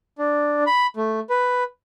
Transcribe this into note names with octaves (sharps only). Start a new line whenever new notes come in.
D4
B5
A3
B4